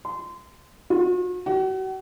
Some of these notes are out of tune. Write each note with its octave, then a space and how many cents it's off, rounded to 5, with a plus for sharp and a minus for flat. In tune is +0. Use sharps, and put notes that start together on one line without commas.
C6 -20
F#4 -45
F#4 +40